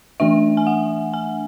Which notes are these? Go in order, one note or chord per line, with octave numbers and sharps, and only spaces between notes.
E3 A3 D4 E5
G#5
F#5
G#5